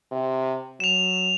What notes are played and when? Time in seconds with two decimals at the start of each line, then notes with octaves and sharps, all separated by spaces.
0.12 C3
0.80 F#3 E7 F7